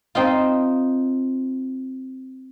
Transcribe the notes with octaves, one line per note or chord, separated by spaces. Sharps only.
C4 D#4 F4